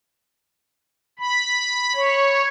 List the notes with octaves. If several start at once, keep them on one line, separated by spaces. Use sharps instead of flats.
B5
C#5